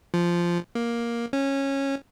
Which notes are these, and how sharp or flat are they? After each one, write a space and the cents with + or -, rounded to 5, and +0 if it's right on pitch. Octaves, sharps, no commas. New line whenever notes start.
F3 -10
A#3 +10
C#4 -15